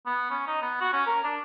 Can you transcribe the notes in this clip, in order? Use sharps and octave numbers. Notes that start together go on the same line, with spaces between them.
B3
C#4
D#4
B3
F#4
C#4
A#4
D4